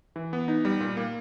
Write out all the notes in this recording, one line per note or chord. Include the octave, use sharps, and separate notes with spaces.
E3
B3
D#4
G3
A#2
A#3